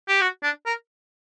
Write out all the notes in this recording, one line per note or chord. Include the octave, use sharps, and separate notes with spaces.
G4
F#4
D4
A#4